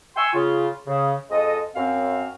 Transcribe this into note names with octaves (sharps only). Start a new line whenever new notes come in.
E5 G5 G#5 C6 C#6 E6
C#3 F4
C#3
F2 G#3 A4 D#5
F#2 C4 F5